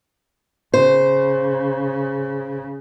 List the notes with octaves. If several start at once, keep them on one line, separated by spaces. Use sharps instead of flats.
C#3 C5